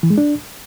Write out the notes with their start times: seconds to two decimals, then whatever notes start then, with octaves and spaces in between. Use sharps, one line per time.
0.03 E3
0.10 G#3
0.18 D4